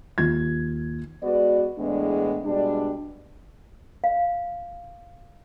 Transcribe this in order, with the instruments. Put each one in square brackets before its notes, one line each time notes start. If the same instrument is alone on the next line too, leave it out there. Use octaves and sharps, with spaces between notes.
[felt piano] D#2 F4 G#6
[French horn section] G#3 B3 F#4 B4 D5
E2 A2 G#3 B3 D4
B2 G3 G#3 D4
[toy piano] F5